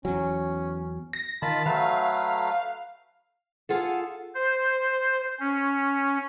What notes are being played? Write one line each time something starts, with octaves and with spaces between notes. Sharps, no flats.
E2 F#3 C#4
A#6
D#3 F4 A5 B5
F#3 A3 B4 F5
F4 G#4 A4 F#5
C5
C#4